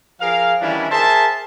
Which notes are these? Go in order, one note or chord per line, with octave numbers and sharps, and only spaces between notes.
F3 G#4 A#4 F5
D#3 E3 G3 C#4 D4 E4
G#4 A#4 C5 E5 A5